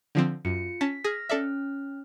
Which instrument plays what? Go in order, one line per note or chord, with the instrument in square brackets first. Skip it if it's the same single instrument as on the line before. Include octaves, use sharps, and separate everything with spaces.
[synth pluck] D3 F3 C4
[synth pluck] F#2 [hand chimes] F4 C#7
[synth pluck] C#4 A5 [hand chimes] B6
[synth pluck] G#4 [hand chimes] F6 A#6
[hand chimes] C#4 F6 [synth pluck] A4 D5 E5